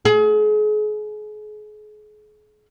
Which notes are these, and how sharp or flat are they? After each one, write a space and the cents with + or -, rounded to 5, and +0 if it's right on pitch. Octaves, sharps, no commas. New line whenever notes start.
G#4 +35